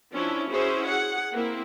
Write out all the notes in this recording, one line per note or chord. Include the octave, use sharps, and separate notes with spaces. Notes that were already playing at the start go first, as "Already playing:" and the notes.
F3 C#4 D4 E4
C#4 E4 F#4 G#4 C5
G#4 F#5
A#3 C4 E4